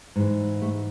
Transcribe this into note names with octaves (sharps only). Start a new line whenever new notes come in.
G#2 E3
A3